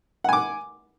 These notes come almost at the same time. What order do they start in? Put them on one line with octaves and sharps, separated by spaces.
F#5 G#5 D6